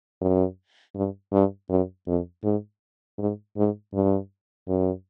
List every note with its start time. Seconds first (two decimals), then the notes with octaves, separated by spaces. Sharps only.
0.21 F#2
0.95 G2
1.32 G2
1.69 F#2
2.07 F2
2.44 G#2
3.18 G#2
3.57 G#2
3.94 G2
4.68 F#2